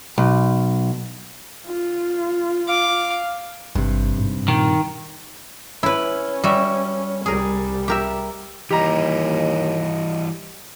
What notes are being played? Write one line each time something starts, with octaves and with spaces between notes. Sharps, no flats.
B1
F4
F5 D6
G#1 G2 C3
G#2
A#2 D#3
C#4 E4 B4
G3 F#4 E5
C2 G3 G#4 A#4
G4 A#4 E5
D#2 E3 G3 G4 D#5 A#5